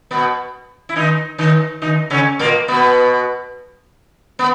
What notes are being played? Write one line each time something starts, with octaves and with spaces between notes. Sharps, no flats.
B2 B3
E4
D#3 D#4
D#3 D#4
D#3 D#4
C#3 C#4
A#2 A#3
B2 B3
B3